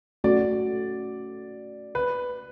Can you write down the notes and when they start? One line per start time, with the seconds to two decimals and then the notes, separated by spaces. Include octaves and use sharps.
0.24 A3 C#4 F#4 D5
1.95 B4